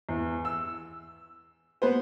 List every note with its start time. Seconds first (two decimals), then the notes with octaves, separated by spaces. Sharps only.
0.09 E2
0.45 E6
1.82 B3 B4 C5